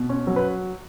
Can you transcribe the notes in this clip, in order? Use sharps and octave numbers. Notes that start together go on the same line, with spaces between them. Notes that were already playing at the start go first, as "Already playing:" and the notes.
Already playing: B2
C#4
F#3
B4